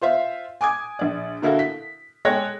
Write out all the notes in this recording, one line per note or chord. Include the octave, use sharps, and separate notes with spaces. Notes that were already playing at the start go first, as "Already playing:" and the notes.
F4 C5 E5 F5
G#5 D6 D#6 G#6
A#1 D5
D3 A#3 E4 F#4 A4
B6
G#3 A4 C#5 G5 F#6 A#6